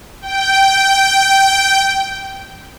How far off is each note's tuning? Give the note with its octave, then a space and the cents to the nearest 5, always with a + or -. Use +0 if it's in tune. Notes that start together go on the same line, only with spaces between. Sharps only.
G5 -10